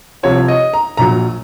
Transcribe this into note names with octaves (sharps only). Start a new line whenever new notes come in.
C2 C3 F3 C#5
D#5
A#5
A#1 A#2 F#3 A#5